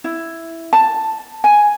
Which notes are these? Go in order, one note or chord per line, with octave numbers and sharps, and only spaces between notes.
E4
A5
G#5